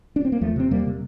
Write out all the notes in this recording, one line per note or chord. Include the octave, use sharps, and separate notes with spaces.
D4
C4
A#3
E2 F3 A3
C3 C4
E2 G3 A#3
C3